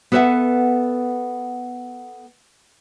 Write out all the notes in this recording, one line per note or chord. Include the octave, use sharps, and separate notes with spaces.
B3 A4 B4 C#5 E5 F#5